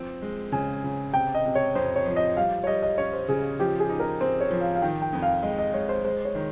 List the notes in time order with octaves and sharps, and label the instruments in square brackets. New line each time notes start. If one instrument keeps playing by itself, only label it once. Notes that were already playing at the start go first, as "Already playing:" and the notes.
Already playing: [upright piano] F3 C4
G#3
[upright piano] C#3 [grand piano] G#5
[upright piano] C#3
[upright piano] C3 [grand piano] G5
[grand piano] D#5
[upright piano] C3
[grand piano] C#5
[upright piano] F2 [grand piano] C5
[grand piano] C#5
[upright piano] F3
[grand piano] D#5
[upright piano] G3 [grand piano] F5
[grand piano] C#5
[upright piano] G3 [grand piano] D#5
[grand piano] D#5
[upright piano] C#4 [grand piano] C#5
[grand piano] C5
[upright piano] C#3 [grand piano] G#4
[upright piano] F3 [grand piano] G4
[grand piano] G#4
[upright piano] D#4
[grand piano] A#4
[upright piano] C4 [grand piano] C5
[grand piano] C#5
[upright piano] F3
[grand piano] F5
F5
[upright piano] D#3 [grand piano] G5
[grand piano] G5
[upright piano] F2
[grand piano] F5
[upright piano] G#3 [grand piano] D#5
[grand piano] D#5
[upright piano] G#3 [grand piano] C#5
[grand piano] C5
[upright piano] G#3 [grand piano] C5
[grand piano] C#5
[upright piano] D#3